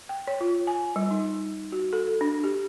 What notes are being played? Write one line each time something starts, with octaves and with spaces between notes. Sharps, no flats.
G5
C#5
F4
G#5
G3
D#4
F#4
A4
D4
G4